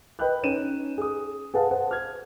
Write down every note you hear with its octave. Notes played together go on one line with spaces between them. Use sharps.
B4 D#5 G5 B5 F#6 G6
C#4 D#4 D#7 E7
G#4 D#6
G#4 B4 F5 F#5 A5
C5 F#5
F6 G#6